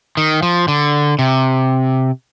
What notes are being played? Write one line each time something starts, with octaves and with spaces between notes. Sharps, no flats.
D#3
F3
D3
C3